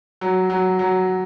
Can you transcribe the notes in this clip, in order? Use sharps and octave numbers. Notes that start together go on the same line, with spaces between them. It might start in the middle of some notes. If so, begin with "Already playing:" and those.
F#3
F#3
F#3